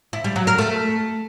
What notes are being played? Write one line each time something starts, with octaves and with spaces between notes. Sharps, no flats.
E4
G3
F#3
A#4
A3